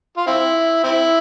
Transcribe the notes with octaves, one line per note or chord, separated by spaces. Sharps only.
F4
C4 E4
C4 E4